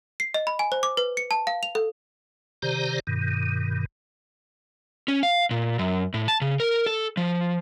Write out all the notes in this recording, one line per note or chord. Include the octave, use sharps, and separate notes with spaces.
C7
D#5
B5
G#5
C5
D6
B4
C#7
A5
F5
F7
A4
C3 D#3 G4 C5 D5 A#5
G2 B2 D#3
C#4
F5
A#2
F#2
A2
A5
C#3
A#4
A4
F3